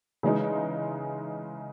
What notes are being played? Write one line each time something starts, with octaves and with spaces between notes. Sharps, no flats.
C#3 E3 G#3 D#4